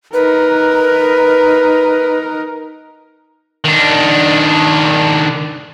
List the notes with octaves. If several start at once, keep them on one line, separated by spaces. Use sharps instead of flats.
D#4 A#4 B4
D#3 D4